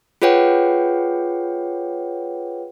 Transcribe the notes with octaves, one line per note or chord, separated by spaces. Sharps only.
F4 G#4 B4 C#5 F#5 G5